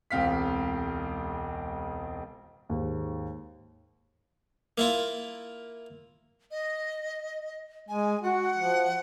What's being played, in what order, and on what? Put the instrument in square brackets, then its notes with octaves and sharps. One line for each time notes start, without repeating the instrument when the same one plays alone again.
[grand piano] E1 C#2 C4 F5 B6
[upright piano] D#2 G#2
[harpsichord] A#3 E4 F4
[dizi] D#5
[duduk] G#3 [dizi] G#5
[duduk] F#4 [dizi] F#5
[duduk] F3